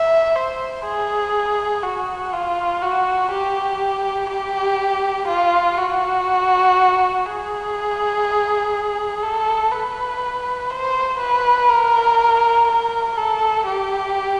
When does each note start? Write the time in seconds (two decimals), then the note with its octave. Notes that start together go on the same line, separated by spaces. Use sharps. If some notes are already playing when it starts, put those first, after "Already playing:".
Already playing: E5
0.36 C5
0.85 G#4
1.83 F#4
2.33 F4
2.82 F#4
3.31 G4
4.30 G4
5.28 F4
5.78 F#4
7.25 G#4
9.23 A4
9.72 B4
10.71 C5
11.20 B4
11.69 A#4
12.68 A#4
13.17 A4
13.66 G4